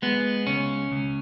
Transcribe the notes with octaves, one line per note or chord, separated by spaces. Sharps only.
G#3 B3
C#2 C#4
C#2